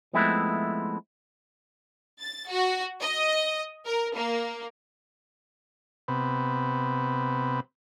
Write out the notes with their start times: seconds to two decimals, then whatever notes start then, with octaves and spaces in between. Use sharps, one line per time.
0.13 F3 G#3 A3 B3 C4 E4
2.21 A6
2.50 F#4
3.01 D#5
3.86 A#4
4.15 A#3
6.08 C3 B3